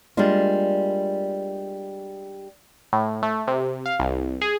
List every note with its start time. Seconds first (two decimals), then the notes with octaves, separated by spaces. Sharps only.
0.17 G3 G#3 A#3 D4 F4
2.93 A2
3.23 A3
3.48 C3
3.86 F5
4.00 C2
4.41 G#4